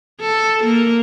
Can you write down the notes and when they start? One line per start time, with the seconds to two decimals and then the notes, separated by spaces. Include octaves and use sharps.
0.21 A4
0.64 A#3